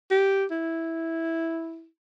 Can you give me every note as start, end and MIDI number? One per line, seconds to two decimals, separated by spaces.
0.11 0.45 67
0.51 1.86 64